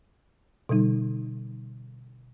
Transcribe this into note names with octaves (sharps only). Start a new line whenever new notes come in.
B2 D3 G3 D#4